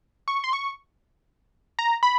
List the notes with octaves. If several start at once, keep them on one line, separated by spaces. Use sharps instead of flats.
C#6
C6
C#6
A#5
B5